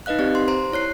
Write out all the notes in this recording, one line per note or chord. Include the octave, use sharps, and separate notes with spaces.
D#4 B4 D#5 F5 F#6
C4 G4 D5
C6
C5 A#5 C6
E4 C#5 F#6 C7